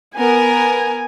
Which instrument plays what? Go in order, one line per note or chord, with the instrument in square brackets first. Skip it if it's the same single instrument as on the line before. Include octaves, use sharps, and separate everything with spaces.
[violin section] B3 A#4 [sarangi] G#5